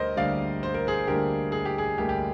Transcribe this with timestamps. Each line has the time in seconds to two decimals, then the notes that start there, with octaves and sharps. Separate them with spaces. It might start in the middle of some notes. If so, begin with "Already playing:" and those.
Already playing: D2 D3 G3 A#4 C5 D#5
0.17 D2 D3 G3 A#3 D5 F5
0.63 C5
0.74 A#4
0.87 G#4 C5
1.07 D2 D3 G3 A#3 G4 A#4
1.52 G#4
1.65 G4
1.78 G#4
1.98 D2 D3 G3 A#3 G4
2.09 G4